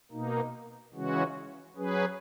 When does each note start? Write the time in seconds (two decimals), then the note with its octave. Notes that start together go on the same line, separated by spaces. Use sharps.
0.12 B2 A#3 D#4
0.94 C#3 E3 G#3 C#4 F#4
1.76 F#3 C#4 G#4 B4